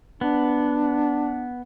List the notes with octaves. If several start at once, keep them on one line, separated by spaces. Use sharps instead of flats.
B3 D4